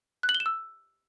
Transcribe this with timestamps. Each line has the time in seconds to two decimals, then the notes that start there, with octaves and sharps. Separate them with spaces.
0.23 F#6
0.29 F#7
0.35 G7
0.40 E7
0.46 E6